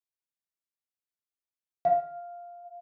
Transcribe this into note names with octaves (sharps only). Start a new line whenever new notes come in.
F5